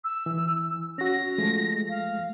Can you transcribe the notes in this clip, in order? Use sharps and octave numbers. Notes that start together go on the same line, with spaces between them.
E6
E3
C#4 F#4 A#6
F3 G#3 A3
F5